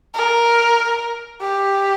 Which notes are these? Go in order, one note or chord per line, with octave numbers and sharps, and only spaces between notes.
A#4
G4